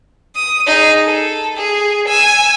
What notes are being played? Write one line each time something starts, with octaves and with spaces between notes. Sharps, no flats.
D#6
D#4 G#4
A4
G#4
G#5 E6